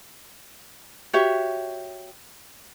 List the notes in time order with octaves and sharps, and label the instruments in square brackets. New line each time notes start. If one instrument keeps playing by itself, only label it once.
[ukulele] F#4 G4 C#5 E5